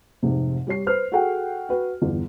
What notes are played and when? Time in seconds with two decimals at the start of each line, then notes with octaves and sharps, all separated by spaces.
0.23 F1 G#2 C3
0.67 G3 G4 C#5 C7
0.87 B4 C5 F6
1.12 F#4 G#4 A4 F#5 G5
1.69 F#4 B4
2.02 G1 E2